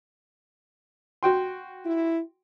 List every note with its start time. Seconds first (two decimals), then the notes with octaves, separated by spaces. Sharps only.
1.23 F#4 G5 C6
1.85 E4